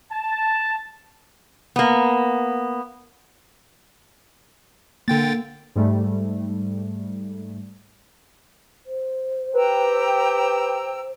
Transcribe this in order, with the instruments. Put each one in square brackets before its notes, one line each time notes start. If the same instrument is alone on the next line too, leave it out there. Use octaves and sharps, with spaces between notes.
[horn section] A5
[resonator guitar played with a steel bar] A#3 B3
[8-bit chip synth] D3 G5 A6 [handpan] A#3
[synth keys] G#2 G3 A3
[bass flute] C5
[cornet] G4 [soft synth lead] B4 [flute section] G5 A#5 E6